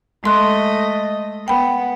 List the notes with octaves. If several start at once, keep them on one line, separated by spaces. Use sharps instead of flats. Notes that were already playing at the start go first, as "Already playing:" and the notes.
G#3 A3 D#5 C6 F#6
B3 G5 B5